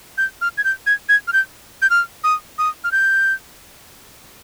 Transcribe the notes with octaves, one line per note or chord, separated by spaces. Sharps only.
G6
F6
G#6
G6
G#6
G#6
F6
G6
G6
F6
D#6
D#6
F6
G6